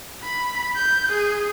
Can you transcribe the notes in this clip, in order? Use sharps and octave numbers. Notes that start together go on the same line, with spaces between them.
B5
G6
G#4